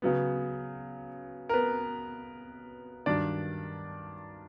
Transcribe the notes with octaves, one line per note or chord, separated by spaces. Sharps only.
C#3 F#3 B3
A#4
B3 B4
G2 D#3 F#3 D4 D5